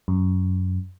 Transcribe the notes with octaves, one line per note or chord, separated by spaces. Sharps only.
F#2